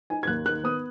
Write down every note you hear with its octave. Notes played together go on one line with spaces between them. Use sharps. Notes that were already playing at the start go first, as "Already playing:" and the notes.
D#4 G#5
G#6
D#2 F#6
D#3 F#6
B3 D#6